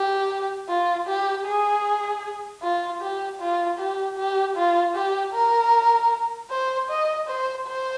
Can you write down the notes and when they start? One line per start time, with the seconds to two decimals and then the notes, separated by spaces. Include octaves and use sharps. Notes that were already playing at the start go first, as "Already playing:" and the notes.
Already playing: G4
0.69 F4
1.08 G4
1.46 G#4
2.63 F4
3.01 G4
3.40 F4
3.79 G4
4.18 G4
4.57 F4
4.96 G4
5.34 A#4
6.51 C5
6.90 D#5
7.28 C5
7.67 C5